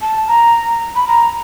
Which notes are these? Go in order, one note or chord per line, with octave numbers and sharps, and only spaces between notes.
A5
A#5
B5
A#5